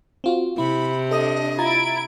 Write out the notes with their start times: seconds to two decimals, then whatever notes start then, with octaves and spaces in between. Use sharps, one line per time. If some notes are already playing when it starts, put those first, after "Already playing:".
0.24 C4 F4 F#4
0.58 C3 E4 B5
1.11 D4 A4 D#5 D#6
1.58 E4 F4 A#5 G#6 A6 D7